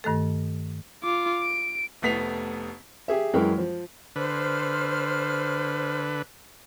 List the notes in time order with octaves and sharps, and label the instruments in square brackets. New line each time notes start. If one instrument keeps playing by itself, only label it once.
[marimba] G2 D#3 A3 A4
[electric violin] F4 D6
D7
[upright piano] F1 A3 B3 B6 C7 F7
[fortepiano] G4 G#4 E5
F#2 E3 G#3 A#4 G5
F3
[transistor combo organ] D3 B4 [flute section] C5 F6